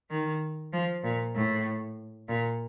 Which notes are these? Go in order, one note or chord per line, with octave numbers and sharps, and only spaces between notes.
D#3
F3
A#2
A2
A#2